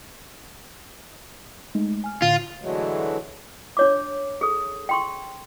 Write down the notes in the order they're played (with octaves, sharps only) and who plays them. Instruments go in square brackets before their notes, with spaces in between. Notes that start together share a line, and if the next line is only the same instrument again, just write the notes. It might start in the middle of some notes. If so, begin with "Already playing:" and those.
[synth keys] G#3 A3 D#4
G#5 F6
[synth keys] A2 D3 [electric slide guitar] F4
[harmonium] D3 E3 F#3 G#3 A3
[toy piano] D4 C#5 D6
G#4 A4
G5 C6 C#6